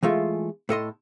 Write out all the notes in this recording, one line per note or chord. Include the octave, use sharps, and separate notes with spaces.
E3 G#3 A3 F4
A2 A4 D#5 C6